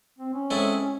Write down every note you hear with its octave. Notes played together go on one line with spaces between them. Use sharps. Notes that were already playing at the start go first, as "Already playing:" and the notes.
C4
C#4
G#3 C4 E4 A4 C#5